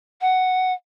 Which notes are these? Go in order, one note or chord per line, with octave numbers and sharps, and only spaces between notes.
F#5